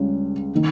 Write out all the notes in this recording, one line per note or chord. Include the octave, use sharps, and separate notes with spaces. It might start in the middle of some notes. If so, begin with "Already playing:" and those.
Already playing: C#2 C#3 G3 C#4
D#3